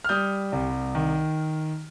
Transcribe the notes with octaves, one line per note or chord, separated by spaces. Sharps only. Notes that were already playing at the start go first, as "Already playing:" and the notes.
F6
G3 D#6 G6
C2
D#3